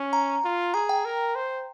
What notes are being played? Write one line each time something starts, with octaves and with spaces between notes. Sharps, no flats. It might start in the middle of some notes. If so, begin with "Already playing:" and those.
Already playing: C#4
A#5
F4
G#4 A#5
G5
A#4
C5